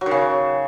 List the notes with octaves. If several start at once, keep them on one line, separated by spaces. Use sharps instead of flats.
F#3
D#3
C#3